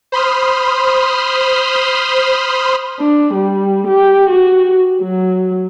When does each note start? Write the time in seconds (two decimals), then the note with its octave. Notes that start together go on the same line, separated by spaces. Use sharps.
0.12 C5 B5 C6 D#6 F6
3.00 D4
3.34 G3
3.87 G4
4.29 F#4
5.01 F#3